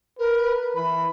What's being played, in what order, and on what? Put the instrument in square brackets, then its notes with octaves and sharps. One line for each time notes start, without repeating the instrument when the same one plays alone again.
[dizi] A#4 [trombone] B4
[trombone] E3 [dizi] B5